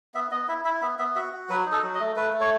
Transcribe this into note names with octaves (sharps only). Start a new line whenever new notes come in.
B3 E5
B3 D#5
E4 E5
E4 E5
B3 E5
B3 E5
F#4 E5
F#4
F#3 B4
D#4
A4
F#3
D#5
A3
A3 B4
A3
C#5